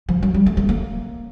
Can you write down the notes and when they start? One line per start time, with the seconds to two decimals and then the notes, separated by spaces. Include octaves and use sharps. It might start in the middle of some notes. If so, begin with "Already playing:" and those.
0.09 F3
0.23 F#3
0.34 G3
0.46 A3
0.57 A3
0.69 A#3